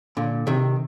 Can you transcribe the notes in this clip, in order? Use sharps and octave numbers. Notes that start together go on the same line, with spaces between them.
A#2 D3
C3 D#3